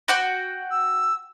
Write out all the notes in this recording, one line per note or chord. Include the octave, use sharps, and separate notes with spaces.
F#4 F#5 G5
E6